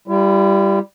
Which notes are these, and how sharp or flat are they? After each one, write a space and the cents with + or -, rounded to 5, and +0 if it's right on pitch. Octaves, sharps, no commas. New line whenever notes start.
G3 +0 E4 +45